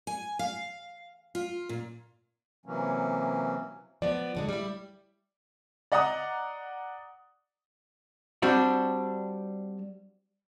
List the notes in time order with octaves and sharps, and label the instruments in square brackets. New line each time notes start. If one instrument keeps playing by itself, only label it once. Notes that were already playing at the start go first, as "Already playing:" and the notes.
[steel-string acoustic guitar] G#5
F5
F4
A#2
[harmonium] C3 E3 F#3 A#3 C#4
[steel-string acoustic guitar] F3 B3 [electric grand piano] D5
[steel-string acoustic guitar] D#2 D3 G#3
G3 E4
[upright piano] D5 D#5 F#5 A#5 D#6
[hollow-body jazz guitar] G3 C4 D4 F#4